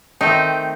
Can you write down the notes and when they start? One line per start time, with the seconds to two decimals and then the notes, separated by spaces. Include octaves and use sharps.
0.21 D#3 A3 C4 D#4